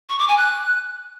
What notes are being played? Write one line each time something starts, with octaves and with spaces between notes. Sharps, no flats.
C#6
D6
G#5
F#6